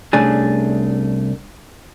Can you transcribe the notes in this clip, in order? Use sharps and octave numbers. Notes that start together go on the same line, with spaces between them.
C2 A3 C#4 D4 G#4